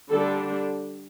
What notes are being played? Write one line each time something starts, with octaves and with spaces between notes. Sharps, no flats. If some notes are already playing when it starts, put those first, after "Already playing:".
D3 G3 D4 A4